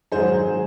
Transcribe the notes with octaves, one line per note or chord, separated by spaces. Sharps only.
G#2 D#3 F#3 G#4 C5
D#3 F#3